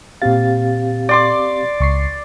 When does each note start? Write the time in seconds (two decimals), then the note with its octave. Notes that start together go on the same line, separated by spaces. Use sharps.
0.22 A#2 C4 G4 F5 A6
1.09 D5 C6 D6
1.80 C#2 C#6 C7